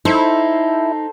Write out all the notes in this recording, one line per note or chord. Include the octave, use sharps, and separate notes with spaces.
D#4 E4 A4 C5